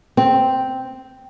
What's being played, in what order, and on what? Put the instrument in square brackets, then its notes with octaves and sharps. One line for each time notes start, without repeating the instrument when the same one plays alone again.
[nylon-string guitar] C4